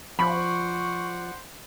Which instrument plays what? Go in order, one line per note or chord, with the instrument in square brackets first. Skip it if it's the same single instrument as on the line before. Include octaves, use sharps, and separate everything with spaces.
[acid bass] F3 [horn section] C5 D5 F#5 [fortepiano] B5 [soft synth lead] C#6